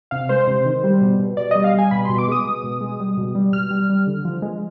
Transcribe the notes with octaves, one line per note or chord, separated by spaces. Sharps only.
C3 F5
G#3 C5
C3
D#3
G3
B2
B2
B2 D5
D#5
G3
F5
G3 G#5
B2 B5
B2 C6
D6
G#3 D#6
B2
B2
G#3
G3
B2
G3
B2 F6
G3
G3
D3
F3
G#3